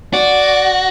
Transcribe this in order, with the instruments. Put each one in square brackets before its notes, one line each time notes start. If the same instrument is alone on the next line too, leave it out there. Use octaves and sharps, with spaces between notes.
[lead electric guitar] F#4 [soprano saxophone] D5